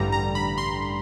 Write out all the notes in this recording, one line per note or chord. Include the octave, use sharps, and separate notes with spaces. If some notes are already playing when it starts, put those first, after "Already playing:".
Already playing: A1 G2 D3 G3 A#5
A#5
B5
C6